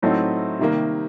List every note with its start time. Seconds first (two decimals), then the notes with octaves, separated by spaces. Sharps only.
0.02 A2 F#3 A3 C4 D#4
0.59 C3 D#3 G3 A#3